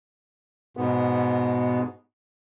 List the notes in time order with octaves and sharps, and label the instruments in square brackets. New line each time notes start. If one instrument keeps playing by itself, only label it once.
[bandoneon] G#2 B2 B3